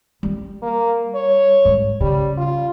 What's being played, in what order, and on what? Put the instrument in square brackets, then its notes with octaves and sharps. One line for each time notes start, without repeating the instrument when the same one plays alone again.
[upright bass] G3
[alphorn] A#3
C#5
[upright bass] G#2
[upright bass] C#3 [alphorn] G3
[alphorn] F4